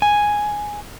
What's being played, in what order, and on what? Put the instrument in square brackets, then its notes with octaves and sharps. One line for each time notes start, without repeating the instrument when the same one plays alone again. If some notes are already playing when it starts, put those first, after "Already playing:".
[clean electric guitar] G#5